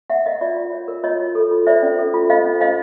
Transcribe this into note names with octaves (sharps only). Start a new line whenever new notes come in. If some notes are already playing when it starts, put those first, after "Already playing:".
C#5 E5 F#5
A#4 D#5 F5
F4 D5 E5
F4
C#5
A#4
F4 C#5 D#5
F4
A4
F4
C5 D5 E5
C#4
A4
F4
C5 D#5 F5
C#4
C5 D#5 F5